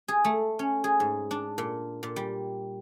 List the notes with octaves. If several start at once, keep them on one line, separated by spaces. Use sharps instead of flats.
G#4
A3
C#4
G#4
G#2
D4
A#2
A#2
G3